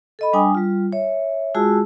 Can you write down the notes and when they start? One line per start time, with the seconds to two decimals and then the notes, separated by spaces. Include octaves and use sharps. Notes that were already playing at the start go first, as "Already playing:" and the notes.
0.19 A4 D#5 B5
0.33 G3 D4 G5 G#5 D#6
0.55 G3 F4
0.92 C#5 E5
1.55 G#3 F4 F#4 G#4 A5 E6